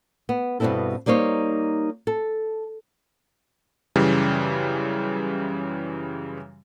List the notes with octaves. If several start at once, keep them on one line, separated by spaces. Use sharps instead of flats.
B3
G2 B2 B3 C4 E4 A4
G3 A#3 D#4 C5 C#5
A4
F#2 C#3 E3 G3